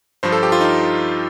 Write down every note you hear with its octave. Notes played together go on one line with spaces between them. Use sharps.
G2 F3 C5
A4
G4
F4
D#4